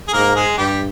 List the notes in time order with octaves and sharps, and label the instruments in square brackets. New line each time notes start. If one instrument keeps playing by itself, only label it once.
[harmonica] G#4
[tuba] G#2 [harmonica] A#3 A#4
[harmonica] G#3 G#4
[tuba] G2 [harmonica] G3 G4